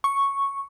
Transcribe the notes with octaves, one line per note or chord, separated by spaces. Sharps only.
C#6